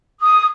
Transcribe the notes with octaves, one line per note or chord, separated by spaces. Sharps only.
D#6